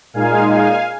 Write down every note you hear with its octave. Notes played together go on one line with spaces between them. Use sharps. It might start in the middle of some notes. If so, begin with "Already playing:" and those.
A#2 G#3 D#4 F5 G#5
F5 G#5